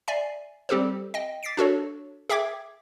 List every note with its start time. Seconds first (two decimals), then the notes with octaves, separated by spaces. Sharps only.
0.08 D5 E5 G#5 C7
0.69 G3 C4 G4 A4 C5
1.14 D#5 G5
1.43 D6 A6 B6 C7 D7
1.57 D4 F#4 A4 C#5
2.29 G#4 E5 G5 D6 G#6